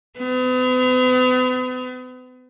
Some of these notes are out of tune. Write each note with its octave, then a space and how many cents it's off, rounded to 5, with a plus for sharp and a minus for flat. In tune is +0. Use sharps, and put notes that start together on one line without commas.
B3 +45